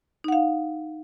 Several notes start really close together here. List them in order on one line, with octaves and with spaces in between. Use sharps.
D#4 F#5 F5